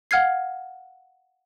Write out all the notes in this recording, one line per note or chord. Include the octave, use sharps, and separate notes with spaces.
F5 F#5 F6 G#6 C7